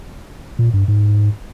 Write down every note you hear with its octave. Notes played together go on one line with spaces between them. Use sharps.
A#2
G2
G#2